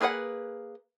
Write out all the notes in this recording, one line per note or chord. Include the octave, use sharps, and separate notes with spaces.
A#3 G#4 B4 C#5 F#5